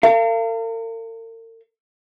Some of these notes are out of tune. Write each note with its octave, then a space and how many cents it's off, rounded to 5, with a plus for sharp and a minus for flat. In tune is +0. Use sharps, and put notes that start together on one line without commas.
A#4 -45 F5 -35